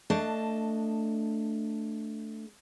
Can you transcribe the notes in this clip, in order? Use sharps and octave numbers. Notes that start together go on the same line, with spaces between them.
A3 D4 D#5 A5